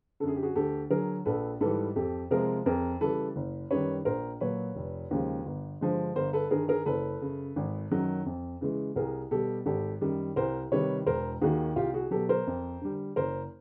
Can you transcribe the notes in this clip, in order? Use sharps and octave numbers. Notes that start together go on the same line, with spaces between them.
F#2 D3 G#4 A4
G4
F#4 G#4
D2 G4 A4
D3 F#3 G#4 A#4
A#1 A4 B4
G#2 E3 G3 A4 B4
F2 G4 A4
C3 F3 G#3 G#4 A#4
F2 G#4 A#4
C#3 E3 G3 A4 B4
F#1
F#2 D#3 G3 B4 C#5
A#1 A#4 C5
A#2 F#3 B4 C#5
F1
D#2 C#3 F3 G#3
G1
G2 D3 F3 G#3
G1 A#4 C5
A4 B4
G2 D#3 G#4 A#4
G#4 A#4
F#1 A4 B4
F#2 C#3
G#1
F#2 D#3 F#3
F2
C#3 E3 G#3
C2 G#4 A#4
B2 G3 G4 A4
G#1 G4 A4
F#2 D#3 G3
C2 A#4 C5
C3 D#3 G3 B4 C#5
E1 A#4 C5
D#2 D#3 F#4 G#4
C2 F4 G4
F#4 G#4
B2 F#3 G4 A4
A#4 C5
F2
D3 G3
F#1 A#4 C5